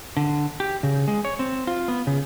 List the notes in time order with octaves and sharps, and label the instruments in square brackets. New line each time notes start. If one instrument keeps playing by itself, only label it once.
[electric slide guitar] D3
G4
C#3
G#3
C#5
C4
F4
B3
C#3